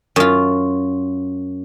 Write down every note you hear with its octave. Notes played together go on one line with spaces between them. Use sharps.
F#2 F4